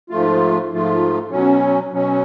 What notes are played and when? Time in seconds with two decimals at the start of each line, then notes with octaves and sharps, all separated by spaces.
0.10 G#2 F3 A3 F4
0.70 G#2 F3 A3 F4
1.31 B2 F#3 C#4
1.92 B2 F#3 C#4